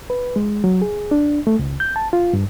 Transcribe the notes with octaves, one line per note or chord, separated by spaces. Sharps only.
B4
G#3
F#3
G#4
D4
A3
C#2
G6
A5
F4
G2